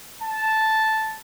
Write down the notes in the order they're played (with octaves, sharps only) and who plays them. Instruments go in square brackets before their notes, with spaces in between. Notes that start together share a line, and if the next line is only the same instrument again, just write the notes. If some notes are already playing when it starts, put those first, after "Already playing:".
[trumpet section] A5